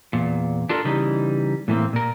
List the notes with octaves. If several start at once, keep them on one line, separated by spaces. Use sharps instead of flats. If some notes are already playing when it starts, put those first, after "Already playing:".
E2 A#2
D4 F4 A4 A#4
C#3 E3 G3 D#4
A2 E3 A#3 C4
A#2 A#4